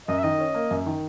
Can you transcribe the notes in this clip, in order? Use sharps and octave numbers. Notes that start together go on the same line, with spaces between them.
F#2 D#5
E5
D#3 D#5
C#4
A#3
F#2
D#3